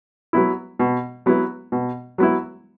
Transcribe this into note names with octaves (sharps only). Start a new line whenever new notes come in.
F#3 B3 E4
B2
F#3 B3 E4
B2
F#3 B3 E4